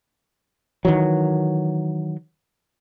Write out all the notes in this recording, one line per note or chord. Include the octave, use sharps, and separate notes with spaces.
D#3 E3 F#3